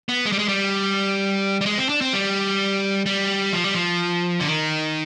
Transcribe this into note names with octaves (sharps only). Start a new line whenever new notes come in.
B3
G#3
G3
G#3
G3
G3
G#3
C4
D4
C4
G3
G3
F3
G3
F3
D3
D#3